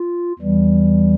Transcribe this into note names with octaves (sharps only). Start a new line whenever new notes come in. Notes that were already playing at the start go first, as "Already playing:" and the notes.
Already playing: F4
E2 E3 G3